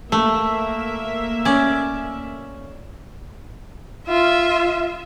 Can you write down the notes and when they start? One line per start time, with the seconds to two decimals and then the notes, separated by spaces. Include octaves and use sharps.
0.12 A3 A#3 E5
1.45 C#4 D5
4.08 F4 E5